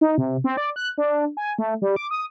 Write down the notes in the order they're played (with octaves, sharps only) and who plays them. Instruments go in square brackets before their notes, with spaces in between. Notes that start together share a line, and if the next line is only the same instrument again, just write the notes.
[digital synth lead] D#4
C3
C4
D5
F#6
D4
G#5
A3
G3
D6
D#6